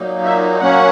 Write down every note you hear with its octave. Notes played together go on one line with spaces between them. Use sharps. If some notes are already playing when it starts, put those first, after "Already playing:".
Already playing: A#2 F#3 A#3 D#4
E5
F#3 A#3 C#4 F#5